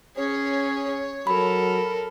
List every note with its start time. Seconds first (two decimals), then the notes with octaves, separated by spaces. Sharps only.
0.17 C#4 G#4 C#5
1.27 F#3 A4 A#4 B5